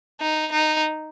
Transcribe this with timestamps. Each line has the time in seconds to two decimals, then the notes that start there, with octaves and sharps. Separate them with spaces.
0.21 D#4
0.52 D#4